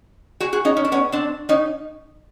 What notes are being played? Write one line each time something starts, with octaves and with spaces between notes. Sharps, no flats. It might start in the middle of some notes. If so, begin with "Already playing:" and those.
F#4 G#4
F#4 G#4
C#4 D#4
C#4
D4
B3 C#4
C4 D4
C#4 D#4